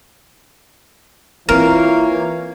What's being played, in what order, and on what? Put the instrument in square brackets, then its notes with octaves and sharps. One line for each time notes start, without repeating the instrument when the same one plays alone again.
[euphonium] E3 [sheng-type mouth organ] A#3 C#5 F5 [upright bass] C4 F4 [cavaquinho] A#4